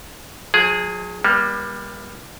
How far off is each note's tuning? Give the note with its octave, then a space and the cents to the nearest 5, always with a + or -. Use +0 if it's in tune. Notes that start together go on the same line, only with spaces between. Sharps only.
F#3 -45 G#4 +0
G3 +15 A#3 +45